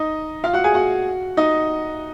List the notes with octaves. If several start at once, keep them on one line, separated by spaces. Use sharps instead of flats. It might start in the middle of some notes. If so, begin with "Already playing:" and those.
Already playing: D#4 D#5
F4 F5
F#4 F#5
G#4 G#5
F#4 F#5
D#4 D#5